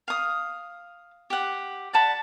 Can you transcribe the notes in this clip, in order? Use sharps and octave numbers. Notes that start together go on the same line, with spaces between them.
F5 D#6
G4 F#5
D5 F#5 A5 B5